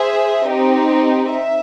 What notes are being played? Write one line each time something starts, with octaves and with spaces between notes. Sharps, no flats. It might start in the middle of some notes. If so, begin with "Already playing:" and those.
Already playing: G#4 C5 E5
C4 D#4 G4
E5